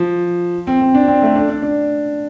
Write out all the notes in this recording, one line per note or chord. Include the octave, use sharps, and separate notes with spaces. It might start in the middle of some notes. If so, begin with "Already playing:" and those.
Already playing: F3
C4
C4
D4
C4
A3
D4
D4
D4